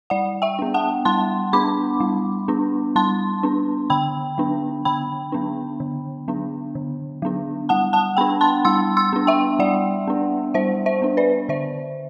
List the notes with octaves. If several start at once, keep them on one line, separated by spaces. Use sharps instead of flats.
G3 D5 F#5
E5 G5
B3 D4
F#5 A5
G3 A5 C6
B3 D4 B5 D6
G3
B3 D4
G3 A5 C6
B3 D4
D3 G5 B5
F#3 B3 D4
D3 G5 B5
F#3 B3 D4
D3
F#3 B3 D4
D3
F#3 B3 D4
G3 F#5 A5
F#5 A5
B3 D4 G5 B5
A5 C6
G3 C6 E6
C6 E6
B3 D4
E5 G5
G3 D5 F#5
B3 D4
G3 C5 E5
C5 E5
B3 D4
B4 D5
D3 C5 E5